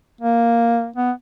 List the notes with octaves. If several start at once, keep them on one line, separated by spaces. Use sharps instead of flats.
A#3
B3